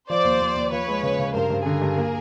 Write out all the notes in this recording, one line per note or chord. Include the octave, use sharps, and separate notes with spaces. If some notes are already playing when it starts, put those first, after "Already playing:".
F3 C5 D5
D#2
D#2
D#2
F3 B4 C#5
G#3
C#3
C#3
G2 A#4 C5
G2
D3 G#4 A#4
G2
A#3